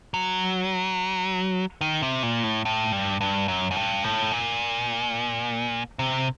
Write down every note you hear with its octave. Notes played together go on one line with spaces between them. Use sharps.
F#3
D#3
C3
A#2
A2
A2
G2
G2
F#2
F#2
G2
A2
A#2
C3